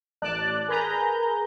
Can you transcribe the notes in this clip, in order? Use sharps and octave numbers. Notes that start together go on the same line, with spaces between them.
A1 D5 A5 F#6
G#4 A#4 B4 A#5 G6